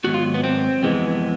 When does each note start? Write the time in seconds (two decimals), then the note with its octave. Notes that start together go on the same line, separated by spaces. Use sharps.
0.04 G#2 D#3 F#3 B3 F#4
0.14 F4
0.34 B3
0.44 C4
0.83 F2 C3 E3 G#3 B3